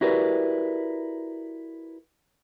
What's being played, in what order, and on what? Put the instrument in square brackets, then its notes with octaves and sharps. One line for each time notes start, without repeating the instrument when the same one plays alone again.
[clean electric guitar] E4 F#4 G4 A#4 B4 D5